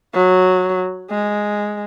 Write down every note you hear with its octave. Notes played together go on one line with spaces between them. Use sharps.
F#3
G#3